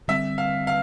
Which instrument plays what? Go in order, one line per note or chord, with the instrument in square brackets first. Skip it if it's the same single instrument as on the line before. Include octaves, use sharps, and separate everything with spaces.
[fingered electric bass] D3 G3 C4 [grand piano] E5
[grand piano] F5
F5